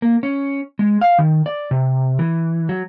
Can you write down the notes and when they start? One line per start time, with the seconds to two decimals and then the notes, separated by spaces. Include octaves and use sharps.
0.02 A#3
0.23 C#4
0.79 G#3
1.01 F5
1.18 D#3
1.46 D5
1.71 C3
2.19 E3
2.69 F#3